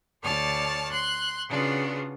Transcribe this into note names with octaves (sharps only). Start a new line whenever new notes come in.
D2 C#5 D5 A5 F6
C6 F#6
C#3 B3 D4 F4 F#4